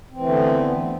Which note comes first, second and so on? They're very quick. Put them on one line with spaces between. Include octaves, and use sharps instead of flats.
C4 E3 A3 D3 B3